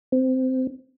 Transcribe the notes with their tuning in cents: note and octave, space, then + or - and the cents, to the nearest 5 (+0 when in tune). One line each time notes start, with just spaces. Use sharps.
C4 -15